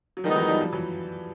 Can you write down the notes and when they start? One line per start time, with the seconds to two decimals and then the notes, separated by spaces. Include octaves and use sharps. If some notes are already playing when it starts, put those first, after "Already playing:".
0.17 F#3
0.24 D#3 F3 G3 G#3 B3 D#4
0.36 E3 F#3
0.48 F3 G3
0.61 F3 G3
0.73 E3 F#3